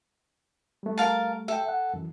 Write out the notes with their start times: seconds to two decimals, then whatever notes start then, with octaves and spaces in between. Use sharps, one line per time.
0.83 G3 A3
0.98 A#4 F5 A5
1.48 A4 E5 G5
1.69 F#5
1.94 F#2 E3